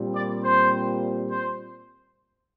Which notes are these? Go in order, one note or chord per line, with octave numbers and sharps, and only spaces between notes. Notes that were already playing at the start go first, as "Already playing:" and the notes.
Already playing: A#2 G3 C4
D5
C5
C5